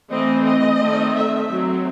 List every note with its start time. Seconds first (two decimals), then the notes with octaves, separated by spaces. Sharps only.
0.10 E3 A3 C4 D#5
0.45 D#5
0.80 D#3 A3 C4
1.15 E5
1.50 F#3 C4